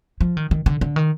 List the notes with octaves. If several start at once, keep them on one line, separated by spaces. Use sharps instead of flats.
F3
D#3
D#3
D3
D3
D#3